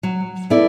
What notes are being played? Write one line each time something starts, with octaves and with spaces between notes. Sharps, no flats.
F#3
B3 E4 A4 D5